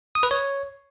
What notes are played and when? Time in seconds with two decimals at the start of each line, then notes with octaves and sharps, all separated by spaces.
0.15 D#6
0.23 B4
0.31 C#5